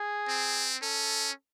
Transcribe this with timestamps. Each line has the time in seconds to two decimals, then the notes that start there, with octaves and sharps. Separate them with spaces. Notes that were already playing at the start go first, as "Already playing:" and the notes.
Already playing: G#4
0.28 C4
0.82 C#4 A4